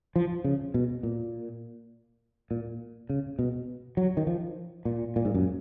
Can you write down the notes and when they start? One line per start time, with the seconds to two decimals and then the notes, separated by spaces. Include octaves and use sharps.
0.16 F3
0.44 C#3
0.74 B2
1.03 A#2
2.51 A#2
3.09 C#3
3.39 B2
3.97 F#3
4.17 D#3
4.27 F3
4.85 A#2
5.16 A#2
5.25 G#2
5.34 F#2